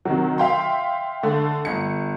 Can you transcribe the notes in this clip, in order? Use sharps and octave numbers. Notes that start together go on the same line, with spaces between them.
C3 D#3 F#3
E5 F5 G5 C6
D3 A3
G1 C#7